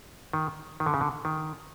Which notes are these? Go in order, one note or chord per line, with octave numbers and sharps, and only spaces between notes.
D#3
D#3
D3
C#3
D3
D#3